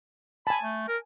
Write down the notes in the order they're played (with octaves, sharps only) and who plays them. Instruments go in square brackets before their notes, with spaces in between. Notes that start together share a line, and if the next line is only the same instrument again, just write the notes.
[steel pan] G#5 A5 [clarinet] B5
[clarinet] A3
A#4